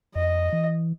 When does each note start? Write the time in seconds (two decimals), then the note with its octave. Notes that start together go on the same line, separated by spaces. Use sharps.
0.16 F2 D#5
0.53 E3